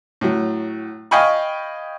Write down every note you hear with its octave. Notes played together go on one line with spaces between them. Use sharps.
A2 F#3
D#5 F5 G5 G#5 B5 C#6